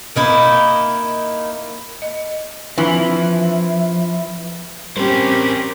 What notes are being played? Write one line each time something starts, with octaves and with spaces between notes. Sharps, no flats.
A#3 D#4 E4
D#5
E3 F3 C4 D4 E5 G#5
G3 C4 C#4 G4 A#4 C5